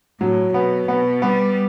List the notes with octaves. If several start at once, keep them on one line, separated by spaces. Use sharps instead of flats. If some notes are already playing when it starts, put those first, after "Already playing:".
A2 F#3
B2 B3
B2 B3
G3 B3